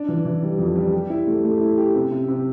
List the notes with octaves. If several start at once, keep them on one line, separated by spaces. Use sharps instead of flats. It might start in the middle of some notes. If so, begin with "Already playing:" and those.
Already playing: D4
E3
E3
G3
F2
G3
G4
E4
A3
A3
E4
G4
C3
C3
C3